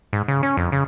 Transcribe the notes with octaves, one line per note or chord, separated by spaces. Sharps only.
G#2
C#3
C#4
F2
C#3